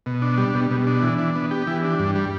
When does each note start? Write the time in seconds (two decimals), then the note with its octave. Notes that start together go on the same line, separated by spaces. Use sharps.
0.06 B2
0.22 D4
0.38 G3
0.55 B2
0.71 B2
0.87 D4
1.02 E3
1.18 D4
1.35 B3
1.51 G4
1.67 E3
1.83 D4
1.99 G2
2.15 G3